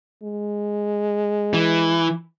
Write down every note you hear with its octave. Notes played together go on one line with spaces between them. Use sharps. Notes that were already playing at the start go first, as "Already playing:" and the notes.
G#3
E3